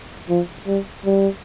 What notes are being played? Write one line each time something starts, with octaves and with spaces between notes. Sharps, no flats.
F3
G3
G3